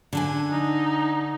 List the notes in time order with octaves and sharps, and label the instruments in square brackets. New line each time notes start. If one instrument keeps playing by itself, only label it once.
[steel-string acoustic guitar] D3 D4 G#5
[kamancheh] D#4